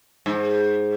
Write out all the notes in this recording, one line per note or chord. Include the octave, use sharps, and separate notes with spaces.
G#2